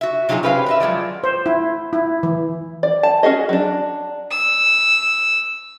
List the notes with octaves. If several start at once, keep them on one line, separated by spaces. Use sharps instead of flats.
F#4 E5
C3 F#3 D#4 F4 F#4 G#4
C#4 G4 B4 C5 D5 F5
B4 D#5 E5
F3 F#3 G#3 D5
C5
E4
E4
E3
D5
A5
C#4 F#4 G#4 D#5
F#3 D4
E6